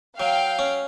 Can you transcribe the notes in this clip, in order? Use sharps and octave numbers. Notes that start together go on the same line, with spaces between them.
F#3 F5 G5
C#4